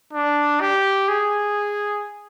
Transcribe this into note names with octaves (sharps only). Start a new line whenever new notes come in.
D4
G4
G#4